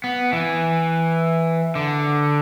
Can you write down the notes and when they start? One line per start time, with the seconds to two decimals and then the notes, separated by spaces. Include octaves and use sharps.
0.04 B3
0.33 E3
1.75 D3